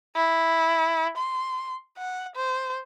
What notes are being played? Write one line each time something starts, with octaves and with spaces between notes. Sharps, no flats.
E4
C6
F#5
C5